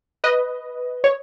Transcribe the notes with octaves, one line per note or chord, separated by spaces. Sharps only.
B4 D#5
C#5